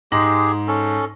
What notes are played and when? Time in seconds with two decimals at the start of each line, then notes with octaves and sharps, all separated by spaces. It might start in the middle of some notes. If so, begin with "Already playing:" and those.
0.12 G#2 G#3 G4 G#4 A#6 F#7
0.68 C#4 A4